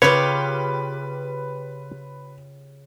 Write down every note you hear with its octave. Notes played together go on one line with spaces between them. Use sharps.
C#3 F4 G4 B4 C#5